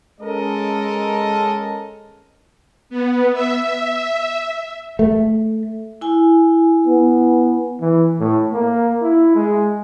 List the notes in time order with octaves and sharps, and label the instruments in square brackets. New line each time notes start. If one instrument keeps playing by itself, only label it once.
[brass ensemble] G#3 C#4 A4 A#4 D#5
[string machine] B3
E5
[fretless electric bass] A3
[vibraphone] E4 G#5
[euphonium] B3
[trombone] E3
A2
A#3
E4
G#3